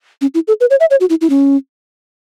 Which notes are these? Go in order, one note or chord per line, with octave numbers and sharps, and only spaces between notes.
C#4
E4
A4
B4
C#5
E5
C#5
F#4
E4
E4
C#4